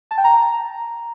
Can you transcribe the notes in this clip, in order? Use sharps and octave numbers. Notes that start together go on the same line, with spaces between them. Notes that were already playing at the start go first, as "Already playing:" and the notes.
A5
G5
A#5